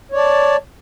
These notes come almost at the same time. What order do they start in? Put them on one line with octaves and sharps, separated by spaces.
C#5 D5 A5